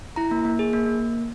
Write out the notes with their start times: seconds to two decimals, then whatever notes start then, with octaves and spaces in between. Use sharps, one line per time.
0.16 E4 A#5
0.31 A#3
0.45 A#3
0.59 G#4
0.73 A#3
0.86 A#3